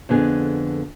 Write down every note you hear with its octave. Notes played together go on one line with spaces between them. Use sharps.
F2 D3 B3 G#4